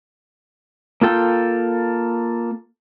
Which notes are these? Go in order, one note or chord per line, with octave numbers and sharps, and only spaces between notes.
A#3 F4 A4 G5